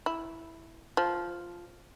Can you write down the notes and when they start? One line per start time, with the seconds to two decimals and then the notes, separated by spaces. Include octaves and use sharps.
0.06 E4
0.97 F3